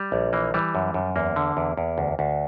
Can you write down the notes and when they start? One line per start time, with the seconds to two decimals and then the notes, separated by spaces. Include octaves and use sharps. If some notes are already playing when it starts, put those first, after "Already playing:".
Already playing: G3
0.12 A#1
0.33 E3 A#3
0.54 E3 G3
0.75 F#2
0.94 F#2
1.16 E2 A#3
1.36 D3
1.57 E2
1.77 E2
1.98 D2
2.19 D2